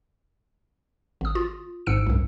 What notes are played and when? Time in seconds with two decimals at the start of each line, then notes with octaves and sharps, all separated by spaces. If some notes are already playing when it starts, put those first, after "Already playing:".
1.21 G#1 D#6
1.35 F4
1.86 G#1 G#2 E6 C#7 D7
2.07 C2 F#2